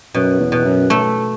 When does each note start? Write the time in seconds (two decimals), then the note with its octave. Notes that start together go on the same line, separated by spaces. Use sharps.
0.14 F#2 B2
0.40 E2
0.52 B2
0.65 F#2
0.90 A3